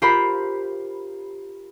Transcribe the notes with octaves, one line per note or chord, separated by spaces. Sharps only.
F4 G4 A#4 C5 B5